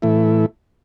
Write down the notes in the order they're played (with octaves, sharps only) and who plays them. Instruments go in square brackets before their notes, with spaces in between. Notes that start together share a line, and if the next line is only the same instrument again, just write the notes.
[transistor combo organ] A2 E3 A3 E4